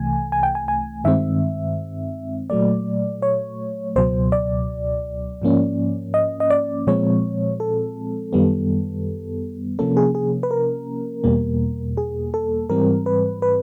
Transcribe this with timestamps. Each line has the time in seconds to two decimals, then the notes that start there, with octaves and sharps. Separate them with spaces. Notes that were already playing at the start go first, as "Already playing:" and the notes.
Already playing: C2 C3 E3 A3 G#5
0.32 G#5
0.43 G5
0.55 G#5
0.68 G#5
1.04 G2 D#3 G#3 C4 E5
2.50 A#2 F#3 A3 D5
3.22 C#5
3.96 C#2 B2 F#3 C5
4.32 D5
5.42 G#2 F3 A#3 C#4
6.14 D#5
6.40 D#5
6.50 D5
6.87 A#2 F3 G#3 C4 C#5
7.60 A4
8.33 F#2 D#3 G3 B3
9.79 C3 F3 A#3 C#4 A4
9.97 G#4
10.15 G#4
10.43 B4
10.51 A#4
11.24 E2 B2 G3 A#3
11.97 G#4
12.34 A4
12.70 G#2 E3 G3 C4 A#4
13.06 B4
13.42 B4